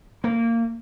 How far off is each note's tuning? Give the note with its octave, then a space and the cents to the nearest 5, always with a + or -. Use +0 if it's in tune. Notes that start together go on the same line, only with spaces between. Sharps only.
A#3 -20